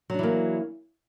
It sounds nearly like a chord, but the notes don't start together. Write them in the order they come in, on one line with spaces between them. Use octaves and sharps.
F#3 D4 E3 A#3